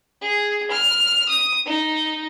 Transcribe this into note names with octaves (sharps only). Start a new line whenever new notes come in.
G#4
F6
D#6
D#4